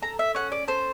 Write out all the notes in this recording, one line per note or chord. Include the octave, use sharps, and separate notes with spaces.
A4 A#5
E5
C#4 F#5
D5
A4 C5